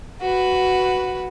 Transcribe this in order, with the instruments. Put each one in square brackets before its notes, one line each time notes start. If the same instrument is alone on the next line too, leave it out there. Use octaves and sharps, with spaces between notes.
[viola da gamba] F#4 B4